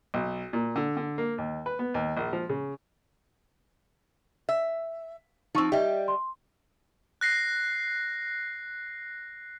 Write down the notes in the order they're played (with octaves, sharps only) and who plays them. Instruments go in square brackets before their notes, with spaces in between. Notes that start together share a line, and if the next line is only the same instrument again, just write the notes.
[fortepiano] B1
A#2
D3
D3
A#3
D#2
B4
B3
D#2
A#1
F3
C#3
[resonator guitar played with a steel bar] E5
[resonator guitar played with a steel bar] F3 C4 [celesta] D#4 C#6 E6
[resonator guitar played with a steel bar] G3 G4 [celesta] D#5 E5
[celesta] C6
[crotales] F#6 A#6 C7